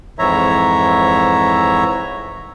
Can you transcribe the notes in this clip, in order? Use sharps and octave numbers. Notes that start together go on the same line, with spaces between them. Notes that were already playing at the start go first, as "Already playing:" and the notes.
F2 G#2 E3 C#5 E5 A#5